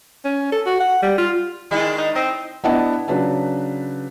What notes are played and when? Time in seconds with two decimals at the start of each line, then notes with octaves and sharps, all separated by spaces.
0.25 C#4
0.52 A4
0.66 F#4
0.80 F#5
1.03 G3
1.18 F4
1.71 D#3 G#3 D4 E4
1.98 D#4
2.15 C4 D#5
2.64 B3 D4 E4 D#5 F#5 A5
3.08 C#3 F#3 D4 B4 A5